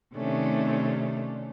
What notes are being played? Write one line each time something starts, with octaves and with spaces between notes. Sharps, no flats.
C3 D#3 A3 C#4 D4